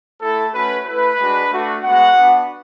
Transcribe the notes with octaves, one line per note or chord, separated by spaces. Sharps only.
A3 E4 A4
A3 C#4 F#4 B4
A3 E4 B4
G#3 D4 F#4
A3 D4 F#4
G#3 B3 F#4 F#5
B3 D4 F#4